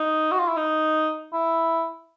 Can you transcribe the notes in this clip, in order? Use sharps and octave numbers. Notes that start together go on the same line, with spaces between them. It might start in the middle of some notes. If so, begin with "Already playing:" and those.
Already playing: D#4
F#4
F4
E4
D#4
E4